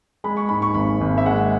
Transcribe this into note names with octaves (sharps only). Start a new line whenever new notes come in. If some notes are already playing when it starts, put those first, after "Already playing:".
G#3 B5
C#6
G#2 B5
C#6
G#1 B5
G#1
E5
G#3 F#5